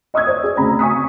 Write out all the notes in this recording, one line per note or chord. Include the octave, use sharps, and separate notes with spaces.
D#5 C#6 D#6 E6 G#6
C5 D5
G#4
D2 C#3 C4 A#5 B5
G#5 C#6 D#6 B6